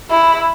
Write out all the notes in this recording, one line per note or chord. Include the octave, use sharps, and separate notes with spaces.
E4